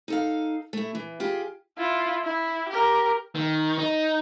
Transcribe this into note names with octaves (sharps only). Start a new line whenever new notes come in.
D#4 A4 F5
A3 E4
E3
F4 G4 G#4
E4 F4
E4
G4 A#4
D#3
D#4